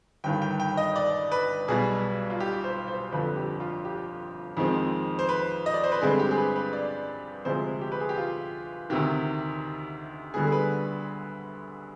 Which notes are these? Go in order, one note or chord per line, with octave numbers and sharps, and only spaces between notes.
G1 G2 D#3 G5
G5
G5
D#5
D5
B4
B1 B2 G3 G#4
F4
G4
C5
C5
G1 F2 D3 B4
G4
F4
G4
F2 D#3 G#3 C4
C5
B4
D#5
D5
C5
B4
G2 D3 G#3 C4 G#4
G4
G#4
B4
B4
D5
D2 C3 F3 G#3 C5
G4
B4
G#4
G4
F4
D2 C3 D#3 G4
D2 D3 G3 B3 G#4
G#4
B4